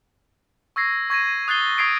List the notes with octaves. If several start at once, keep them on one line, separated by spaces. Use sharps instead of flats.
C#6 E6 G#6 A#6 C7
C#6 G#6 A#6 D#7
D#6 F#6 A6 C7 G7
C#6 D#6 G#6 C7 D7